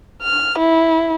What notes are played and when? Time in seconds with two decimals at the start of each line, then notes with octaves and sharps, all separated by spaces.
0.22 F6
0.58 E4